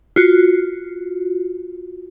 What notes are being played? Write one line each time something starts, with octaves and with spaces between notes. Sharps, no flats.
F4 F#4